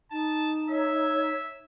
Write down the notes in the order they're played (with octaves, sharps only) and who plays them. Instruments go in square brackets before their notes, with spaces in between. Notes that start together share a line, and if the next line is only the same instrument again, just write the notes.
[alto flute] D#4 [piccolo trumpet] A5
[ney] C#5 [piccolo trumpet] E5